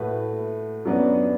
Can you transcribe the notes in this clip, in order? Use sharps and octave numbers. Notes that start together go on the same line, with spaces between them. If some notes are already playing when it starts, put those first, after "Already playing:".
Already playing: A2 A3 F#4 B4
F#2 F#3 B3 D4 B4